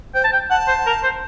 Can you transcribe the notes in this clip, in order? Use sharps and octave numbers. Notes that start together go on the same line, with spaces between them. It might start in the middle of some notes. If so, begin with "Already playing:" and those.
C5 G5
A5
G5
F#5 A5
C5
A#4
C5